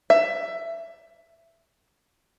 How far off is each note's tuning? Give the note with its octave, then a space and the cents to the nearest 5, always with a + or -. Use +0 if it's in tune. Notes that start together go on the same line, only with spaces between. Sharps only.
E5 +15